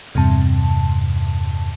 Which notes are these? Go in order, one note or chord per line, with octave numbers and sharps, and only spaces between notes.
E2 G2 C3 A5